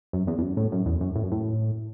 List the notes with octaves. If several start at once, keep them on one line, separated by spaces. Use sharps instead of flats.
F#2
E2
E2
F#2
A2
F#2
E2
F#2
A2
F#2
A2